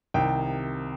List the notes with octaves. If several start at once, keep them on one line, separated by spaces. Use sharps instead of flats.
C2 C3 D#3 G5